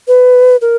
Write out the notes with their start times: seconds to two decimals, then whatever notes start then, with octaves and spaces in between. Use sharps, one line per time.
0.08 B4
0.62 A#4